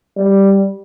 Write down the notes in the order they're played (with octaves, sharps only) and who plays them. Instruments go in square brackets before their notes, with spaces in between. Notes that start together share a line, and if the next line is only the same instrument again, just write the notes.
[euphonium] G3